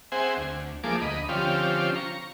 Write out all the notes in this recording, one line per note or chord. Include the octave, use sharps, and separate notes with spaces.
C4 G#4 C5 E5 F#5 G#5
D2
F3 A3 A#3 G#4 D6
D2 D#5 B5
D3 F3 C4 C#4 F4 G4
A#5 C#6